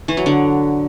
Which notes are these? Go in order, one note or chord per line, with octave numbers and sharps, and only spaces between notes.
E3
F#3
D3